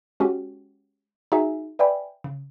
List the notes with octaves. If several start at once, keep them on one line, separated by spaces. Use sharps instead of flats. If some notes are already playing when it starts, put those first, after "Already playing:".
G#3 C#4 F#4 G4
D#4 F#4 G#4 E5 G#5
B4 D5 E5 G5 G#5 B5
C#3